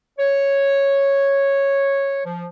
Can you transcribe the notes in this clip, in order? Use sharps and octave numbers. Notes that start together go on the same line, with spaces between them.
C#5
F3